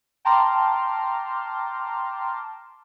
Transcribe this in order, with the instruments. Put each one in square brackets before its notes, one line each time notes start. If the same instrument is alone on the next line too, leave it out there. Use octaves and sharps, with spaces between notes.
[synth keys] G5 A5 A#5 C6 D6 F6